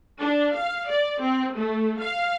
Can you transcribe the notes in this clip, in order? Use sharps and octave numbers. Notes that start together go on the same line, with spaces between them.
D4
F5
D5
C4
A3
F5